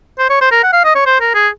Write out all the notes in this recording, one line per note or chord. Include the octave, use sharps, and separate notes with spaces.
C5
C#5
C5
A#4
F#5
F5
D#5
C#5
C5
A#4
G#4